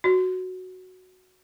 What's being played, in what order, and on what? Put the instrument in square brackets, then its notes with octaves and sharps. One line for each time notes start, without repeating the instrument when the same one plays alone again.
[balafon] F#4